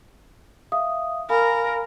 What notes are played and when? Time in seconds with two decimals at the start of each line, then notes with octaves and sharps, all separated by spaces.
0.72 E5 F5 D#6
1.30 A#4 F5 G#5 B5